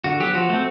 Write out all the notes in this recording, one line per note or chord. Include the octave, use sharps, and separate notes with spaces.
D3 F#4
F#3 B3 G4
F3 F#4
A3 C4